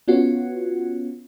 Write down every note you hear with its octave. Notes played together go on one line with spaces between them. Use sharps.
B3 C#4 F4 F#4